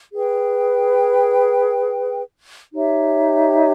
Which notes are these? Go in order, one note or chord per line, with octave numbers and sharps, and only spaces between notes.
G#4 B4 G5
D#4 G4 C#5 E5